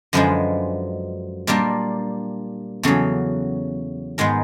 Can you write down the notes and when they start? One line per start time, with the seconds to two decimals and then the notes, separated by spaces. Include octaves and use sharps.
0.13 F#2 D3 F3 G#3 B4
1.47 A#2 G3 A#3 D4 A#4
2.83 E2 C#3 F#3 A4
4.18 G#2 D#3 G#3 B3 A#4